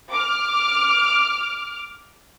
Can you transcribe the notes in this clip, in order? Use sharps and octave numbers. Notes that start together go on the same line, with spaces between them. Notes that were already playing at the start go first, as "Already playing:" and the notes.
D6 F6